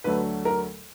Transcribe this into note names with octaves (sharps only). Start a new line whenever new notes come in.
D2 D3 F#3 A3 B4
A#4